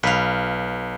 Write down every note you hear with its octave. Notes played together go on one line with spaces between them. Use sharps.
B1 B4 F5